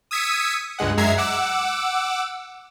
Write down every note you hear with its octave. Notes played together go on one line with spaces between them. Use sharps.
D#6 E6 G#6 B6 C#7 D#7
C#2 G2 G#3 F#5
F#2 G#3 E5 A#5 G#6 C7
F#5 D6 E6